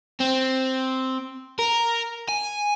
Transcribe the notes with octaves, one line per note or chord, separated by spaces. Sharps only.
C4
A#4
G#5